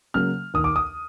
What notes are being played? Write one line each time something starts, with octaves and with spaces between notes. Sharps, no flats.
C#3 F#3 A#3 F6
D#2 D#6
D6
D#6